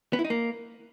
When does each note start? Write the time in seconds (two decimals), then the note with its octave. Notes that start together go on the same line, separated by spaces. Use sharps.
0.13 B3
0.19 E4
0.25 D#4
0.30 A#3